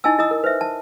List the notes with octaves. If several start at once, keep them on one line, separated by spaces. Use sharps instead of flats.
D#4 E4 D#5 G#5 A5 E6
E4 D#5 A#5 D#6 E6
A#4
B4 C5 E5
A5